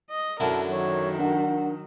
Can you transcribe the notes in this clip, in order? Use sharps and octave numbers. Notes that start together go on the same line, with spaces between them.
D#5
F#2 D3 E4 A#4 F#5 A5
D#3 F#3 C#5
D4 A#4 F#5